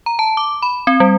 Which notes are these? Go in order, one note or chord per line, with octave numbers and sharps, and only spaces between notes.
A#5
A5
D6
B5
C4
G3